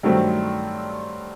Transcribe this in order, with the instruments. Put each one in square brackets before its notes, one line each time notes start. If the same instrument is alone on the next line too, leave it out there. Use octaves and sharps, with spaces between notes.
[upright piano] G2 D#3 F#3 A3 C4